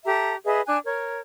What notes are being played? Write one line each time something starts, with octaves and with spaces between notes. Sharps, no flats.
G4 A4 E5 A#5
G#4 B4 D#5 E5
D4 G#5 F#6
A#4 C#5